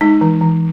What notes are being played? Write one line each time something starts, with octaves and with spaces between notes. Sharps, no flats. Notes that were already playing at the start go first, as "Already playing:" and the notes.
G#3 D#4
E3
E3